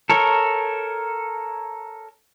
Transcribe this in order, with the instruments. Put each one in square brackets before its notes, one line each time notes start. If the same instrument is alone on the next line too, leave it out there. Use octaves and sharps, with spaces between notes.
[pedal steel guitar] A4 A#4 C#5